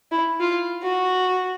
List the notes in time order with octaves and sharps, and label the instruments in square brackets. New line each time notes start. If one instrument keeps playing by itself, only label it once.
[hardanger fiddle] E4
F4
F#4